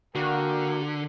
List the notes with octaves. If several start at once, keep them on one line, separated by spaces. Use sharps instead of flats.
D3 A#3 F#4 A#4 G5